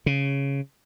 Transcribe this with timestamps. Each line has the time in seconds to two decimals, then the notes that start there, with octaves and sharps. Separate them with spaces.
0.06 C#3